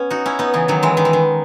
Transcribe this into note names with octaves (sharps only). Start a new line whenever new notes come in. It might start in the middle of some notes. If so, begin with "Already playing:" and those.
Already playing: B3 C#4
D#4 F#4
C#4 E4
B3 D#4
C#3 E3
D#3 F#3
E3 G#3
D#3
E3
D#3